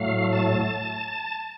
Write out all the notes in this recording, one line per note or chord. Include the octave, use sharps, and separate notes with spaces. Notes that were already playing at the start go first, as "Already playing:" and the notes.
Already playing: A2 F#3 A3 F5
A5